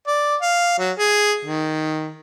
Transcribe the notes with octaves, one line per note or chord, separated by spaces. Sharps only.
D5
F5
F#3
G#4
D#3